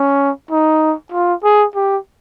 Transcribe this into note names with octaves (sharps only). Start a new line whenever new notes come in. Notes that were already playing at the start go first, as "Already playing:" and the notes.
Already playing: C#4
D#4
F4
G#4
G4